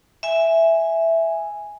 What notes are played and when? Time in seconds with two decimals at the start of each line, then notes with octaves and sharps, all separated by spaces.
0.23 E5 G#5